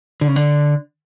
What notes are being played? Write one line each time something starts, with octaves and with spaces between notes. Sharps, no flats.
D3
C#3
D3